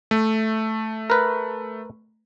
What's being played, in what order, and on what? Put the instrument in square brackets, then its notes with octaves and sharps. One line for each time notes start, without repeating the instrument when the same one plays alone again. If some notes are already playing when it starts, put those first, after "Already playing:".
[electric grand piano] A3
[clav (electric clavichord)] A#4 B4